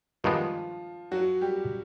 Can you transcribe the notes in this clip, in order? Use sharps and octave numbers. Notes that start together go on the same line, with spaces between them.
G2 D#3 F3 G#3 B3 D4 F4
F#3 F#4
G3 G4